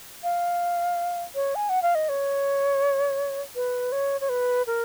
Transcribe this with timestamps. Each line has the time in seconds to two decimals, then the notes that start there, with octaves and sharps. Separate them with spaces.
0.23 F5
1.35 C#5
1.55 G#5
1.69 F#5
1.82 F5
1.95 D#5
2.09 C#5
3.56 B4
3.92 C#5
4.21 C#5
4.29 B4
4.67 A#4